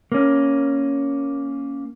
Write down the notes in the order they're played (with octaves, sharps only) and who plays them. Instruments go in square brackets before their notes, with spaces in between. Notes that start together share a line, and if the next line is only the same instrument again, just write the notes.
[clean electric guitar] A#3 C#4